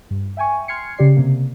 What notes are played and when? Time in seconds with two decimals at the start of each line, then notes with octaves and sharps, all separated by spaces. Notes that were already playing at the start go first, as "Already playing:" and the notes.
0.11 G2
0.37 E5 G5 G#5 C#6
0.68 C6 F6 G#6 C7 C#7
0.98 C#3 G4 D5 C7
1.16 C3 A#3